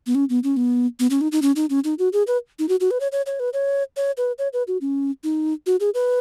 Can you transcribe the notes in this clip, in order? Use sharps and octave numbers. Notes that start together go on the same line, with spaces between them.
B3
C#4
B3
C#4
B3
B3
C#4
D#4
D#4
C#4
D#4
C#4
D#4
F#4
G#4
B4
D#4
F#4
F#4
B4
C#5
C#5
C#5
B4
C#5
C#5
B4
C#5
B4
F#4
C#4
D#4
F#4
G#4
B4